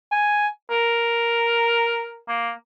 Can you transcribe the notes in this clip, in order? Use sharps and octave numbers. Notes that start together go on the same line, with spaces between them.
G#5
A#4
A#3